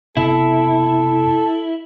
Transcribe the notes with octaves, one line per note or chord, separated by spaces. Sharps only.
F#1 C3 B3 E4 A4